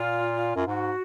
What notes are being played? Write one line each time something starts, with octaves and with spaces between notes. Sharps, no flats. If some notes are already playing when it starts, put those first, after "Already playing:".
Already playing: A#2 F4
F#2 F4
G#2 F#4